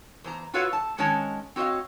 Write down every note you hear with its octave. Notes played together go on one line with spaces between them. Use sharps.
E2 C5 A#5
F4 F#4 A4 B4 C#5 F5
A5
D#3 G#3 C#4 C#5 A5
C4 F#4 C#5 D#5 F5